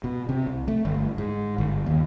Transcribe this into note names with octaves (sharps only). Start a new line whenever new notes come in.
B2
C3
C2
A3
G1
G#2
G1
D#2